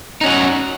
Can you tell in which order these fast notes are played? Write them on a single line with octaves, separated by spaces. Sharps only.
D#4 C#4 F#4